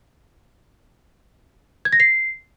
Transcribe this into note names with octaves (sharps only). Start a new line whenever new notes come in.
G#6
A#6
C7